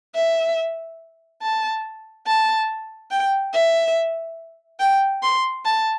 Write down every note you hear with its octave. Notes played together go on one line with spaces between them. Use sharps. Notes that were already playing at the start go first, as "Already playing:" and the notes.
E5
A5
A5
G5
E5
G5
C6
A5